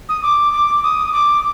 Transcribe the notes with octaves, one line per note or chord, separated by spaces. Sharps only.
D#6
D6
D6
D#6
D6